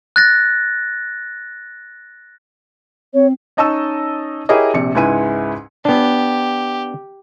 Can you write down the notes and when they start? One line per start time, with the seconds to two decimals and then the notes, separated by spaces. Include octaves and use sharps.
0.16 F#6 A6 A#6
3.14 C4 C#5
3.57 C#4 D#4 D#5 A5 C#6 E6
4.49 E4 G4 G#4 A#4 C#5 D#5
4.74 A#1 C3 C#7
4.95 C#2 G#2 E4 B4 G#5 D#7
5.85 B3 D4 G4